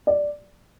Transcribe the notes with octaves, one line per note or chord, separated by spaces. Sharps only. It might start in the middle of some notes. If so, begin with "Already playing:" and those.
D5